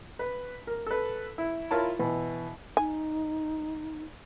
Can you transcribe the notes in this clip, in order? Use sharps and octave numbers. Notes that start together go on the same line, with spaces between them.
B4
A#4
A4 B4
E4
E4 F4 A#4 C#5 A5 B5
B2 E3
D#4 G#5